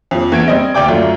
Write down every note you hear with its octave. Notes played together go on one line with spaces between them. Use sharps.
F2 F3
E2 G#6 D7
G3 C4 D#5
D2 D5 G5 D6
F#2 A3 F4